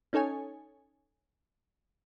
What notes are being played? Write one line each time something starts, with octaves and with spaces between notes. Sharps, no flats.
C#4 D#4 A4 C#5 G#5